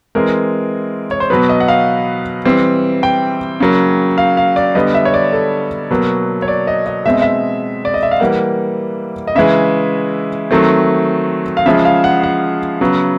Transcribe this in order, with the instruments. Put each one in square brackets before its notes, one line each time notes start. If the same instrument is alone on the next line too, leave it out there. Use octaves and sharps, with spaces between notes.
[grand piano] E3 G#3 C4 A#4
C#5
C5
B2 F#3 B3 B4
D#5
F#5
F5
E3 G3 C4
G5
C#3 F#3 A#3
F5
F5
D5
D3 G3 B3 D#5
E5
C#5
D5
A4
B2 F#3 A#3
C#5
D5
D#5
D#5
B2 G#3 C4 E5
D#5
E5
D5
D#5
E5
F5
E3 G3 A#3 F#5
D#5
C#3 E3 G#3 E5
D#3 F#3 A3 C4
F5
C#3 F3 G#3 E5
F5
F#5
F#5
C#3 F#3 B3